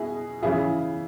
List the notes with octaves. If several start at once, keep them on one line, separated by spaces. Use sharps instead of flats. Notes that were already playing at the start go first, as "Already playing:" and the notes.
Already playing: B2 E4 G#4
C#3 E3 E4 G#4